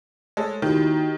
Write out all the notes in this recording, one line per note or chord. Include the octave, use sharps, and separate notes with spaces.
G#3 A4 C5 C#5 G#5
D#2 D#3 D#4 E4 F#4 G4 A#4